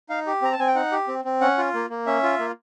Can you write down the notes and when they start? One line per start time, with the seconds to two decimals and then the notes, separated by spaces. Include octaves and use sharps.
0.09 D#4 F5
0.27 G4
0.42 C4 A#5
0.52 A5
0.59 C4 G#5
0.68 G5
0.75 D#4 F#5
0.92 G4
1.08 C4
1.25 C4
1.41 C#4 F#5
1.58 F4
1.74 A#3
1.90 A#3
2.06 C#4 E5
2.23 F4
2.39 A#3